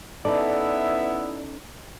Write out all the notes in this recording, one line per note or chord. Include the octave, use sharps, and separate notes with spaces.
B3 C#4 D#4 E4 A4 D5 E5